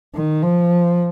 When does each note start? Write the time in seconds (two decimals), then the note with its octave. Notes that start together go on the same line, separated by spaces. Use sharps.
0.15 D#3
0.43 F3